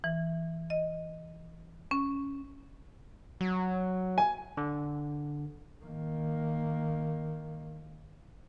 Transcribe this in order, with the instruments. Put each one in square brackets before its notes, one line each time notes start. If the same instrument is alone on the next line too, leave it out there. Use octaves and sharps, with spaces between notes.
[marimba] E3
D#5
C#4
[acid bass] F#3
[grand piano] G#5
[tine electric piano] D3
[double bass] D#3 A#3